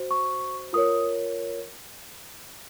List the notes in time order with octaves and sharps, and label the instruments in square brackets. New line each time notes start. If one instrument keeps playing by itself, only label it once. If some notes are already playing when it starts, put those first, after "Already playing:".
Already playing: [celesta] F#4 C5
C#6
F4 A#4 C#5 D#6